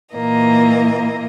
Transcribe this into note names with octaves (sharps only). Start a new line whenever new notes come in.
A#2 E3 A#3 D#5